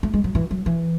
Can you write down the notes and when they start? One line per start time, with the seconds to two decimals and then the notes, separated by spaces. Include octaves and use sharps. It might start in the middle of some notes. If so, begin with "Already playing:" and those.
0.03 A3
0.14 G#3
0.24 F#3
0.35 E3
0.51 F#3
0.66 E3